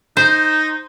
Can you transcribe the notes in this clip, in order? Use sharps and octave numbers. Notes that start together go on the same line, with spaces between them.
D#4 C5